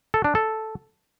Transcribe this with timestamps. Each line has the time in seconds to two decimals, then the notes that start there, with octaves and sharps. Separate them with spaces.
0.14 A4
0.24 D4
0.35 A4